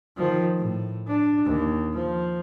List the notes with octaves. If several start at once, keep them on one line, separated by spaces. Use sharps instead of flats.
D#3 F3
A2
D4
D#2
F3